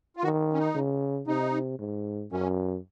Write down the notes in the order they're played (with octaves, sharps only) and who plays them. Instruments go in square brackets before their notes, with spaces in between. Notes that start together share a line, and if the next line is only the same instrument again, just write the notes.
[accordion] F4
[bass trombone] D#3 [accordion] F#4
[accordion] C#4
D#4
[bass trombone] C#3
[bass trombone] C3 [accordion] D#4
[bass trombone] G#2
[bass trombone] F#2 [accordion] C#4